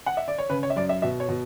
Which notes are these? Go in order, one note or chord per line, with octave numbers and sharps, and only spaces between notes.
F#5
E5
D5
C#5
C#3 B4
C#5
E5
F#2 D5
E5
B2 E5
C#5
B2